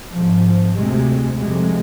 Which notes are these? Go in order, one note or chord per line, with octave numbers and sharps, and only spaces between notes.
G#1 G#2 F3
D2 C3 G#3
F1 F2 C3 G#3